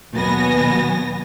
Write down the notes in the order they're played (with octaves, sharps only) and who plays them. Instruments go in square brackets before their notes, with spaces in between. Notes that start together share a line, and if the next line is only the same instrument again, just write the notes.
[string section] D#2 B2 F#3 B3 G#5 A#6